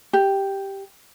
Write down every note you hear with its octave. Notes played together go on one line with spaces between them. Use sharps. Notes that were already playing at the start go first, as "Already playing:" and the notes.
G4